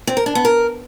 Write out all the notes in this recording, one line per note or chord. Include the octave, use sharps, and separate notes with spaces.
C4
A#4
D4
B3
A#4